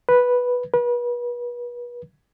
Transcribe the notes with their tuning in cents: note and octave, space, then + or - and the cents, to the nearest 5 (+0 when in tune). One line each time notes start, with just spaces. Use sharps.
B4 -5
B4 -35